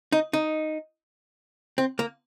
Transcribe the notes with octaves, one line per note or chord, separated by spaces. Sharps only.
D#4
D#4
C4
A#3